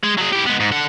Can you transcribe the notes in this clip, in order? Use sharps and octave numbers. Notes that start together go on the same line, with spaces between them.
G#3
F#3 G#4
E4 G4
G#3 B3
G#2
D3 F#5